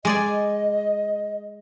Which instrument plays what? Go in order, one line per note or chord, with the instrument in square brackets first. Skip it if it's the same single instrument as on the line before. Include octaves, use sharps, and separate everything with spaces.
[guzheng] G#3 D5 G#5 [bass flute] D#5